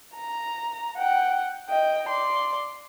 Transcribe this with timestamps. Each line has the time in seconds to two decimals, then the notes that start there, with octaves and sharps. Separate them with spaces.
0.15 A#5
0.98 F#5 G5
1.70 D#5 G5
2.08 D5 C6